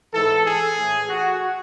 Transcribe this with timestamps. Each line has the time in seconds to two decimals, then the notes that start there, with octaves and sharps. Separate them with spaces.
0.12 G#2 E3 A4
0.44 G#4
0.77 A2 E3
1.09 F#4